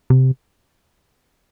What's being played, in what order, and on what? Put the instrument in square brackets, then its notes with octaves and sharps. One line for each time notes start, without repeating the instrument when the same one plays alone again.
[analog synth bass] C3